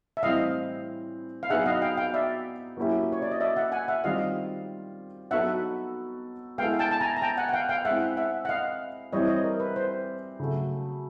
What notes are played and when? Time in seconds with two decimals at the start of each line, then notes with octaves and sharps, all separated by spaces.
0.17 E5
0.22 A2 E3 G3 C4 D#5 F5
1.43 F5
1.50 F#3 B3 D#4 G#4 E5 F#5
1.66 D#5 F5
1.82 F5 G5
1.97 F5 G5
2.14 D5 E5
2.77 F#3 A#3 C#4 E4 G4
3.13 C#5
3.22 D5
3.31 D#5
3.40 D5 E5
3.56 E5 F#5
3.72 F#5 G#5
3.88 E5 F#5
4.04 D#3 G3 C4 F4 D#5 F5
5.31 F#3 B3 D#4 F#4 A4 E5 F#5
6.58 G#3 B3 E4 A4 F5 G5
6.79 G5 A5
6.91 A5
7.01 G#5 A#5
7.17 A#5
7.22 G5 A5
7.37 F#5 G#5
7.49 F#5
7.53 F5 G5
7.69 F5 G5
7.85 G#3 C4 E4 E5 F#5
8.17 E5 F#5
8.45 F#5
8.49 D#5 F5
9.12 E3 G3 C4 E4 C#5 D#5
9.28 C#5 D#5
9.44 A#4
9.60 B4
9.76 C5
10.40 C#3 F#3 A3